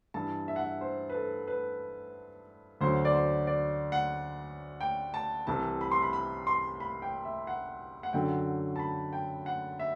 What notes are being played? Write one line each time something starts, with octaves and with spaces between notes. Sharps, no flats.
G2 E3 A5
E5
F#5
E5
C5
B4
A4
B4
D2 D3 F#3 C5
D5
C5
D5
F#5
G5
A5
C2 C3 E3 A5
B5
C6
B5
B5
C6
B5
G5
E5
F#5
F#5
F#2 D3 F#3 G5
A5
B5
G5
F#5
E5